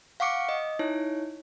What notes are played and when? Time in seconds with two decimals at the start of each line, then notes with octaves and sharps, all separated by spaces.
0.20 F5 F#5 C#6 D6 C#7
0.49 D#5
0.79 D#4 E4 C#5